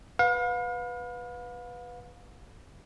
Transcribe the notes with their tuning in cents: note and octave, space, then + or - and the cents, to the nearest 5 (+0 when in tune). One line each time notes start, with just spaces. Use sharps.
B4 +0 F5 +40